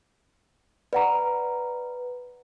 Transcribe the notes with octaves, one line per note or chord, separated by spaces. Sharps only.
B4 D5 F#5 A#5